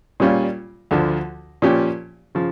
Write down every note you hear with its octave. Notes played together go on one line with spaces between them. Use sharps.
A#2 G3 C#4 F4
D2 D3 F3
A#2 F3 C#4 G4
C#3 F3